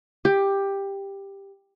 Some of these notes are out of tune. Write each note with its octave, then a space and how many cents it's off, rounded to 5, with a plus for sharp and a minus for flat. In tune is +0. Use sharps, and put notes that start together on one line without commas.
G4 +10